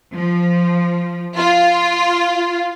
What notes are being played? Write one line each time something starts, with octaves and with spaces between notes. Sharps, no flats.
F3
F4